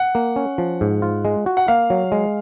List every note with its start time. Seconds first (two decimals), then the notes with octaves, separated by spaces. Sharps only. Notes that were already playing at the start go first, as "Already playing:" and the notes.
Already playing: F#5
0.15 A#3
0.36 C#4
0.58 F3
0.81 G#2
1.02 F4
1.25 G#3
1.46 F#4
1.57 F#5
1.68 A#3 F5
1.90 F#3
2.12 G#3